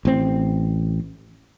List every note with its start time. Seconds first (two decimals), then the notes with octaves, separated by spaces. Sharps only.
0.05 A1 C4